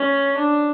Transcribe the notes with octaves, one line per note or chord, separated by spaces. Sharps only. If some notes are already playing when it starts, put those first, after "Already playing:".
Already playing: C#4
D4